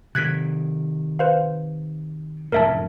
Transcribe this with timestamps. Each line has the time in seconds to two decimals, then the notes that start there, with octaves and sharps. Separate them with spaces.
0.15 C3 D#3 F#6 G#6 B6
1.19 B4 C5 F5
2.52 F1 F#2 A2 A#4 E5 A5